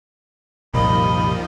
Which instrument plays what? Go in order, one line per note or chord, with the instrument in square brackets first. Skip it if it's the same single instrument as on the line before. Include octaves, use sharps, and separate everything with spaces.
[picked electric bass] C2 F#2 A#2 [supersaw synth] D#3 F3 G3 [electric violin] D#5 [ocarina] B5